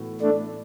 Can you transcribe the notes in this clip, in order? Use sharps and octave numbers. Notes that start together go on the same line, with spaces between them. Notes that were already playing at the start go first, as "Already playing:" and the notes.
Already playing: A2 E3 B3 F#4
A3 D4